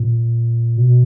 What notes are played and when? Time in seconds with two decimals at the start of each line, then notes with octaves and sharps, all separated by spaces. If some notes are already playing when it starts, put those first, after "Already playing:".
Already playing: A#2
0.77 B2